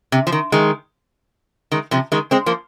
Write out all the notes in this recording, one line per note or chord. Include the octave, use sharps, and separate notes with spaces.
C3
F3
D#3
D#3 G#3
D#3 G#3
C3 F3
D#3 G#3
G#3 C4
F3 A#3